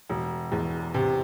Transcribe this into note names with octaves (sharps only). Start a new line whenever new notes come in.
E1
E2
C3